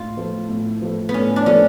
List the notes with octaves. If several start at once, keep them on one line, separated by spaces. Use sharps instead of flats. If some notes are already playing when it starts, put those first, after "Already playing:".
Already playing: A2 F4
F3 A3
A2
F3 A3
B3
A2 C#4
D4
F3 A3 C#4